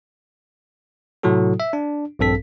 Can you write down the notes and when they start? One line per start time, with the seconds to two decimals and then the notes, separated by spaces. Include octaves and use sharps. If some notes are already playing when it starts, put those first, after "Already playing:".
1.23 A2 C3 F#3 E4 F#4 A4
1.60 E5
1.73 D4
2.19 A#1 G2 C4 A4 B6